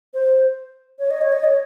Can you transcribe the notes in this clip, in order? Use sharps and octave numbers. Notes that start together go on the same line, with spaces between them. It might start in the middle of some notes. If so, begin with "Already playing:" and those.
C5
C#5
D#5
C#5
D#5
C#5